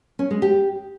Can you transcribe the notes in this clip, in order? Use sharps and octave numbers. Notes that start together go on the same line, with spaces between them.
C#4
G#3
G4